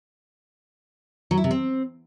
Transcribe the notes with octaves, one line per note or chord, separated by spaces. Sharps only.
F#3
E4
C3
C4